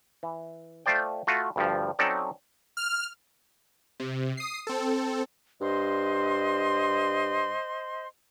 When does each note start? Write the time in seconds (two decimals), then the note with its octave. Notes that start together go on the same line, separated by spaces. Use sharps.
0.23 E3
0.86 A3 F4 C5 D5 G5
1.27 A3 F4 F#4
1.56 D2 G2 F3
1.99 F#3 C4 C#4 D#4 A4 D5
2.77 F6
4.00 C3
4.37 D#6 C7
4.67 C4 A4
5.61 G2 C5 D#5 C6